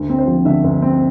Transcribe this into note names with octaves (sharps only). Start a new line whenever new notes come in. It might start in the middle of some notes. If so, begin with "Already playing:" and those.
Already playing: D2
C4
C5
F3
D3 E5
D2
C4